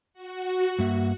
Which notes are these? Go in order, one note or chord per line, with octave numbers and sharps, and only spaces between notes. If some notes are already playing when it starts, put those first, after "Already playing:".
F#4
G2 A#3 E5